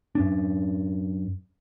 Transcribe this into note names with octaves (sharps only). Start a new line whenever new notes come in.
F#2 C#4 D4